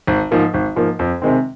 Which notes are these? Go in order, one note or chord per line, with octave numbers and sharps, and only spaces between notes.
G#1
G#2 F3 A#3
G#1
G#2 F3 A#3
F2
C3 D#3 G#3 C4